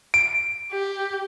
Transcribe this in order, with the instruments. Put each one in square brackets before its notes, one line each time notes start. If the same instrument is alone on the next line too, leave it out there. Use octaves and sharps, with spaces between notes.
[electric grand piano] D7
[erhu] G4